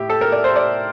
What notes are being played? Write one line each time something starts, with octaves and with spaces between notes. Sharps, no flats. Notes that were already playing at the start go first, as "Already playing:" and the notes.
Already playing: A2 E4 G4
A4
A#4
D5
C5
D5